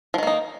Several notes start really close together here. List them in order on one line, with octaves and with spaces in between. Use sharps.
F3 D#3 A#3 D#4